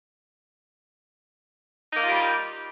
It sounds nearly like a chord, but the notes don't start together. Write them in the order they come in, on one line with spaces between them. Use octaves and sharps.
D#4 A#3 F4 G4 G3